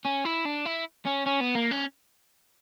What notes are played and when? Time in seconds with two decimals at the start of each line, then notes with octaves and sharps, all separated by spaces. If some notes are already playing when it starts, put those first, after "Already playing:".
0.06 C#4
0.25 E4
0.45 D4
0.65 E4
1.05 C#4
1.26 C#4
1.40 B3
1.55 A#3
1.71 C#4